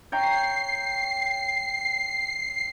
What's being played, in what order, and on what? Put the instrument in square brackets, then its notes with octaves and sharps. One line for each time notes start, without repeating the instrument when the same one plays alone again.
[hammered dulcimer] C#5 G5 A#5 [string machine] C7